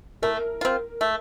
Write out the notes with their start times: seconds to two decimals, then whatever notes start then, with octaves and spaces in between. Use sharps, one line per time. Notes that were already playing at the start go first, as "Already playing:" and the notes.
0.22 A3 A#4
0.61 C4 F4
1.01 A3